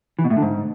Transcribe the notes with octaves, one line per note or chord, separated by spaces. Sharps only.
E3
B2
A2
D3
G#2